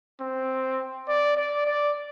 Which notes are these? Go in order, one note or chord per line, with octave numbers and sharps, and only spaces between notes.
C4
D5
D5
D5